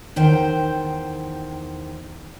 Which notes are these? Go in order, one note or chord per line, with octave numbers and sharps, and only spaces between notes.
E2 D#3 C5 G5